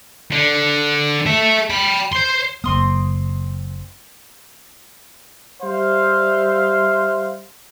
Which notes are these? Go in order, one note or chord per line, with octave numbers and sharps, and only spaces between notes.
D3
A4 E5
G5 B5
C5 C6
F#1 A#3 C4 C6 D#6
G3 C5 E5 F5